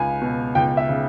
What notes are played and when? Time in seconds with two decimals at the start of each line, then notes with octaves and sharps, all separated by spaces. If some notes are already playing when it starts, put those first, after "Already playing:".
Already playing: C#2 C#3 G#5
0.22 B2
0.55 C#2 G5
0.77 E5
0.89 C#3